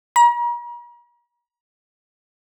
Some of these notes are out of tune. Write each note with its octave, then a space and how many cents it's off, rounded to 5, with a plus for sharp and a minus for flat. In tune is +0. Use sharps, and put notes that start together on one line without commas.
A#5 +45